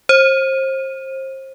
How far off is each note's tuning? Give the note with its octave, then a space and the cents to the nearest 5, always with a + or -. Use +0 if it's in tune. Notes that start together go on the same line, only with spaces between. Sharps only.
C5 +30